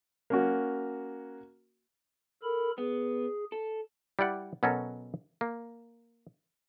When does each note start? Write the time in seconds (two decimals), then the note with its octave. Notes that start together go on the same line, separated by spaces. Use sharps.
0.30 A#3 C#4 F#4
2.43 A4 A#4 B5
2.78 B3 G#4
3.52 A4
4.19 G3 E4 D5 F#5
4.63 B2 F#3 C#4 F#4 A4 A#4
5.41 A#3